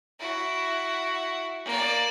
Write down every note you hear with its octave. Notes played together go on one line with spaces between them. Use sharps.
E4 F#4
A#3 D5